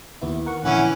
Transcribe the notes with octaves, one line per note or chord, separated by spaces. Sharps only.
D#2 B3 E4
A#4 F#5 C#6
A#1 D3 E3 B3 C#4 F#5